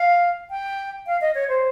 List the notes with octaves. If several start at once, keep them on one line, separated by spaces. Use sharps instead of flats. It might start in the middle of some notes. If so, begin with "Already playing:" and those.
Already playing: F5
G5
F5
D#5
C#5
C5